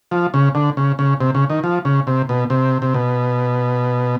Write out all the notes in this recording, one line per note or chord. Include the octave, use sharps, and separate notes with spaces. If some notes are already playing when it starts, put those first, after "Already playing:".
F3
C#3
D3
C#3
C#3
C3
C#3
D#3
F3
C#3
C3
B2
C3
C3
B2